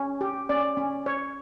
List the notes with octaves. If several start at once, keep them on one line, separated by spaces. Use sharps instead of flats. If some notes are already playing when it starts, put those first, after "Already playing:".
Already playing: C#4
G4
C#4 D5
C#4
C#5